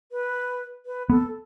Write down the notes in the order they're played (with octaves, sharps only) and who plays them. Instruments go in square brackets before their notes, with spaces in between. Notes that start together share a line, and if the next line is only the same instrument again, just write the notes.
[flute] B4
B4
[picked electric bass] B3 [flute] A4